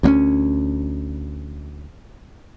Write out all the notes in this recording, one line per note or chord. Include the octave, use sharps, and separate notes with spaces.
D2 A#3 C#4